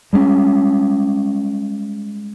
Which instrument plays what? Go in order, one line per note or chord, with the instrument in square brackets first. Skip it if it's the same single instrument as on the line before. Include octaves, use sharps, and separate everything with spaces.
[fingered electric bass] G3 G#3 A#3 C#4